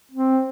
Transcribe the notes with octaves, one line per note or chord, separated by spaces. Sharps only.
C4